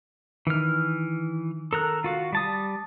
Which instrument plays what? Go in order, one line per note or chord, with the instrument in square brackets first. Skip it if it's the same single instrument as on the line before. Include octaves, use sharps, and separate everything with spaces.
[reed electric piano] D#3 [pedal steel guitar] E3 F6
[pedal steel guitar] A4 A#4 F#6
F4 F#4 F5
G3 A5 D#6